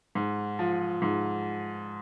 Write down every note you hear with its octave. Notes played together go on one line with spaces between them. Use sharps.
G#2
F3
G#2